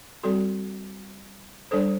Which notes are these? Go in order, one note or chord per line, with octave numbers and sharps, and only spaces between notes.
G3 C4 F#4 A4
G3 D4 A4 C5